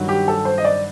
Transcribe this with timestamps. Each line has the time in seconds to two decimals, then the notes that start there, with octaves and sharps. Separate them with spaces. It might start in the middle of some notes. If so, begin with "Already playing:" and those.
Already playing: G2 D#3 F#3
0.08 G4
0.28 A4
0.45 C5
0.58 D#5
0.64 D5